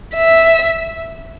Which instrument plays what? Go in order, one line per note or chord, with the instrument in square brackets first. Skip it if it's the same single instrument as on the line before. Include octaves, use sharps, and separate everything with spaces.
[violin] E5